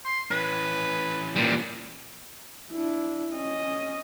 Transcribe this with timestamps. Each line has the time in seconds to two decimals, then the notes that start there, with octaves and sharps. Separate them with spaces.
0.05 C6
0.31 E3 C#4 B4
1.36 A#2 G3
2.72 D4 E4
3.33 C#4 D#5